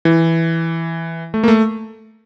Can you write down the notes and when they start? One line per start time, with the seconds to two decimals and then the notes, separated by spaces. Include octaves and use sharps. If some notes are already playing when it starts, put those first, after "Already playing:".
0.05 E3
1.34 A3
1.43 A#3
1.48 A3